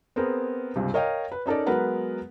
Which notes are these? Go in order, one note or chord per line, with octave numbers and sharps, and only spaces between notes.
B3 C4 G#4 A#4
C#2 G2 C3
A#4 C#5 D#5 F5 G5
B4
C#4 D#4 A4 A#4 D5
F#3 G#3 B3 A#4 B4 F#5